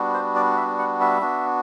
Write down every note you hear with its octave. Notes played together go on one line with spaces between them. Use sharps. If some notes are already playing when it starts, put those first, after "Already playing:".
Already playing: G3 B3 D4 F#4
C5
D5
E5
F#5
E5
B3 D4 F#4